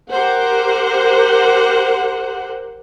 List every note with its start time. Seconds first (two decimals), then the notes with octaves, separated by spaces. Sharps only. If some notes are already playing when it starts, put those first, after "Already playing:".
0.12 G4 A#4 C5 F#5